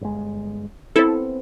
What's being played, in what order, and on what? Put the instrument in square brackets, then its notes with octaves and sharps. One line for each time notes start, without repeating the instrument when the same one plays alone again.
[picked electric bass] G1 G#3
[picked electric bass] B3 C4 [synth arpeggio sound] E4 A4